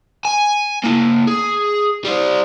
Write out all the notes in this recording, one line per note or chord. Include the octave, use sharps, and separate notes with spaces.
G#5
A#3 E4
G#4
G3 C5